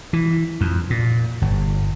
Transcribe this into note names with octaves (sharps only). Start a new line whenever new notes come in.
E3
F2
A#2
G1